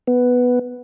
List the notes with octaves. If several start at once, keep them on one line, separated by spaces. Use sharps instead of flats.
B3